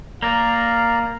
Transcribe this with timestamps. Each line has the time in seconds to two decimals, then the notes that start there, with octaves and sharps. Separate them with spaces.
0.22 A#3 D5 F5 A#5